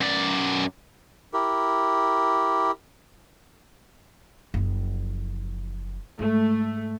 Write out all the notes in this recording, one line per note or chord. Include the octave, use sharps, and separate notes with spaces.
F#2 D5
E4 G4 A#4
F#1 F3
G#2 A3